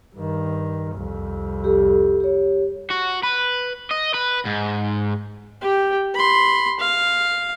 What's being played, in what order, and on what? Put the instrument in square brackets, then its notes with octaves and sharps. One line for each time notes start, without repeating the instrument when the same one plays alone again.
[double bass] G2 D#3
C2 F2
[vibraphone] G4 A4
G4 C#5
[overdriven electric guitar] F#4
B4
D#5
B4
G#2
[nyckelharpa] G4 G5
B5 C6
F5